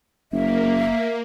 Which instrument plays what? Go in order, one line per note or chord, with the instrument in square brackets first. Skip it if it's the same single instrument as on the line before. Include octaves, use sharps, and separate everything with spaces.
[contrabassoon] F#1 [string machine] A#3 [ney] E5